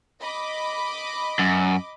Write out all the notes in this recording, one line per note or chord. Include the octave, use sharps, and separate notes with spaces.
D#5 B5 D6
F#2